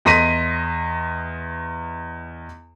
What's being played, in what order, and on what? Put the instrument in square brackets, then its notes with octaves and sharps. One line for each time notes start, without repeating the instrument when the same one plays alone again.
[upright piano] E2 D#5 C6 A#6 B6 D#7